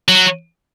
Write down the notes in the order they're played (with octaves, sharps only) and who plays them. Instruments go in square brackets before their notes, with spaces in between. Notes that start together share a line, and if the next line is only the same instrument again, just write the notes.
[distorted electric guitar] F#3